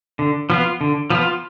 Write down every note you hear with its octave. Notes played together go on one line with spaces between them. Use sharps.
D3
F3 B3 F4
D3
F3 B3 F4